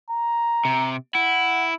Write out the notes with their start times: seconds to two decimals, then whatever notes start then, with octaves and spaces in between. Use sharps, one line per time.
0.10 A#5
0.65 C3
1.15 E4 F#5